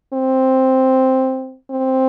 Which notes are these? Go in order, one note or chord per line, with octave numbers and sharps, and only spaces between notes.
C4
C4